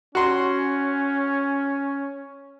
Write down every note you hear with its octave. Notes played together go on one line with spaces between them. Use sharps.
C#4 F#4 C6